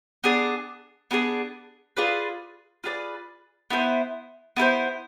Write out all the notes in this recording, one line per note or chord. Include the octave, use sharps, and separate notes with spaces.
B3 D4 G#4 D5
B3 D4 G#4 D5
F4 G#4 B4 D5
F4 G#4 B4 D5
B3 E4 A4 C5
B3 E4 A4 C5